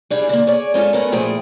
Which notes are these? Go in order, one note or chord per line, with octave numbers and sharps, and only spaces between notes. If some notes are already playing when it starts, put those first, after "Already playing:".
G3 D4 E4 G#4
D3 A#3
G#4 C#5 D5
G#3 C#4 F4 A4
A3 B3 C#4 A#4
A#2 F3 A3 E4 G#4 G5